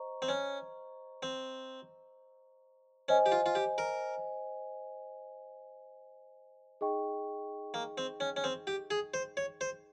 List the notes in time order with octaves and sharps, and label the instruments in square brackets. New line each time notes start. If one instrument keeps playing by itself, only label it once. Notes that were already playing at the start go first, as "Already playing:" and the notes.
Already playing: [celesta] C5 D#5 A#5 C#6
[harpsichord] C4
C#4
C4
[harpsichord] C#4 [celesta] C5 D#5 G#5
[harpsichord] G4
F4
F4
G4
A#4
[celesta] D#4 G#4 D#5 G5 C#6
[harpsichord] A#3
C4
C#4
C#4
C4
G4
G#4
C5
C#5
C5